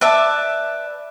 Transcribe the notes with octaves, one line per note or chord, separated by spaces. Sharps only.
B4 D5 E5 A5